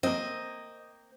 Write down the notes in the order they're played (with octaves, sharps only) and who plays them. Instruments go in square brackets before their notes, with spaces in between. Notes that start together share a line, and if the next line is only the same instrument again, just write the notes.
[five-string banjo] A#3 C4 [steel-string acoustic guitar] D#5